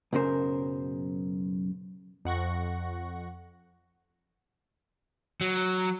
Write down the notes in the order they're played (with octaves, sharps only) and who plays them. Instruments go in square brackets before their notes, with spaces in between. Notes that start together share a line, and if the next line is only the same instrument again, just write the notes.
[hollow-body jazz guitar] B1 F#2 C#3 A#4 C5
[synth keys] F2 F#5 C#6 A#6
[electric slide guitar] F#3